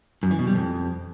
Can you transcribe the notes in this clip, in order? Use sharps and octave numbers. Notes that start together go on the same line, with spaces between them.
F#2
E3
B2
G3
F2